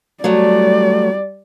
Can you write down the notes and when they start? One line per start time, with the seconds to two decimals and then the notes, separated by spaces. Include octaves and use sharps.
0.24 F#3 G3 A3 D5